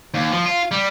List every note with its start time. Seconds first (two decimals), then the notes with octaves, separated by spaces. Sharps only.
0.14 D#2
0.32 F3
0.46 F4
0.71 G3